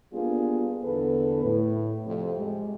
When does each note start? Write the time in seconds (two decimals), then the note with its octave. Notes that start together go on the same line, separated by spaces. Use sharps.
0.13 G3 A#3 B3 D4 F4 G#4
0.84 E2 D3 B3 A4 B4
1.43 A2
2.06 F2 C3
2.38 G3 G#3